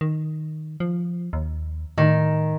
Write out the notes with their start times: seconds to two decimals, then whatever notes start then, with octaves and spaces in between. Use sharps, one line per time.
0.01 D#3
0.80 F3
1.33 D#2
1.98 A2 D#3